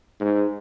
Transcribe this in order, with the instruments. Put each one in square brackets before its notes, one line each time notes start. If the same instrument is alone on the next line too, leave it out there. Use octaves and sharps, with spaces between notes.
[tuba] G#2